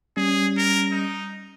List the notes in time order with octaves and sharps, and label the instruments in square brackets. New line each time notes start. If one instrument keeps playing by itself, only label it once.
[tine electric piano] G3 C#4 [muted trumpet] G#4
[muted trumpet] A#4
D#4